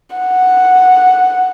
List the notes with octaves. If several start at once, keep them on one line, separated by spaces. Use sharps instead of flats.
F#5